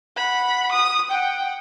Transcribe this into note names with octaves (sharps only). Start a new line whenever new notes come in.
F#5 B5
D#6
F#5 G5